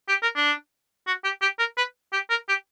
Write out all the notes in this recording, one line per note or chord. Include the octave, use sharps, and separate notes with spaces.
G4
A#4
D4
F#4
G4
G4
A#4
B4
G4
A#4
G4